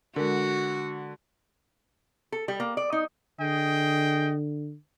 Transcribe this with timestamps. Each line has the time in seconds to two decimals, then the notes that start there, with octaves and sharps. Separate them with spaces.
0.16 D3 G#3 F#4 A#4
2.32 A4
2.48 G3
2.60 A#3
2.77 D5
2.93 D#4
3.40 D3 G#4 D#5 G5